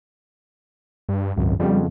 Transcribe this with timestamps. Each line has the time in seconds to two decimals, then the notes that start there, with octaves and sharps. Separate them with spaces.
1.09 G2
1.37 G#1 C#2 F#2
1.60 F2 C#3 G3 B3